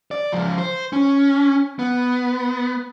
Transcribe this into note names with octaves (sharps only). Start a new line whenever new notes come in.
D5
C#2 F3
C5
C#4
B3